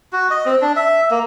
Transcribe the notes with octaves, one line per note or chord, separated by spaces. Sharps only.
F#4
D#5
C4
D4
E5
A#3